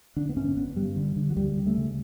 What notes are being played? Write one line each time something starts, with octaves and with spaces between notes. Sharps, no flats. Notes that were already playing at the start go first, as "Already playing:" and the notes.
D3 D4
B3
G2 C#4
G1 B3
G2 G3
D3
D3
F#3
D2 G3
C#3
A3
C#3